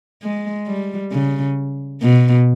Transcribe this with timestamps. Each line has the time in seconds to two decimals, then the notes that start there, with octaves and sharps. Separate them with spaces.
0.23 G#3
0.67 G3
1.12 C#3
2.02 B2